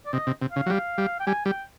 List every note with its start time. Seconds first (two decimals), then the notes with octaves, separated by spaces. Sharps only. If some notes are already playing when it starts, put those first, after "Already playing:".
0.06 D5
0.13 C3 D#5
0.27 C3
0.42 C3
0.52 C#3 F5
0.66 F#3
0.70 G3 F5
0.98 G3
1.20 G5
1.27 G3 G#5
1.46 G3 G5